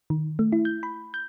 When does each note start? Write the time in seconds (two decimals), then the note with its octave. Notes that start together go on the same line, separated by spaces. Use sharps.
0.10 D#3
0.39 A3
0.52 E4
0.65 G6
0.83 B5
1.14 G6